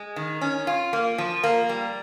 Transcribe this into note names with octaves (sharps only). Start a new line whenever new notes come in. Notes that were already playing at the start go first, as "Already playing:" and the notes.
Already playing: G#3
D#3
C#4
F4
A#3
F3
A#3
G3